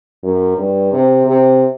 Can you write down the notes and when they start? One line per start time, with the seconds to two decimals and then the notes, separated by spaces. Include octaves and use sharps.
0.23 F#2
0.58 G2
0.93 C3
1.27 C3